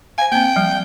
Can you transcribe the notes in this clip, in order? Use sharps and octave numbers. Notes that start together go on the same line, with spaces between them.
C5 F5 G#5
A#3 C4 G5
F3 G3